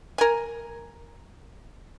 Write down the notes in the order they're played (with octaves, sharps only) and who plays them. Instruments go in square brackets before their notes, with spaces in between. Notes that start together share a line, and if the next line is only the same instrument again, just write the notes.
[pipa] A#4 G#5